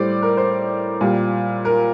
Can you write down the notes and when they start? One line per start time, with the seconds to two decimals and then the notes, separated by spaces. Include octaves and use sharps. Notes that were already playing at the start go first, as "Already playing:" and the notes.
Already playing: A2 G3 C5 D5
0.22 A#4
0.37 C5
1.01 A#2 G3
1.65 A#4